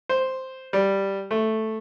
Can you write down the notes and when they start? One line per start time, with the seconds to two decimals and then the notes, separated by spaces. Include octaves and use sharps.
0.09 C5
0.73 G3
1.31 A3